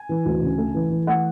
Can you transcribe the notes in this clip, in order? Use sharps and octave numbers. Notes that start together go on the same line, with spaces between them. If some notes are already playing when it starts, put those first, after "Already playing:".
Already playing: G#5
E3
D2
C#3
A3
E3
E3
A3 F#5